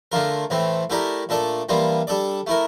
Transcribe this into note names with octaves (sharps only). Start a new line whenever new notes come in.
D3 A3 D4 F4 A#4
A2 E3 A3 C4
A3 E4 G4 A#4 D5
A#2 A3 D4 A4 D5
E3 G3 A#3 D4 F4
G3 D4 A4 D5
A3 E4 A#4